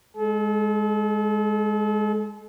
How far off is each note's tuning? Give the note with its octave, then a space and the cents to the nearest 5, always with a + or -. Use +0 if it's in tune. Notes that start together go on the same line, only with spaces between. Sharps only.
G#3 +0 A4 -40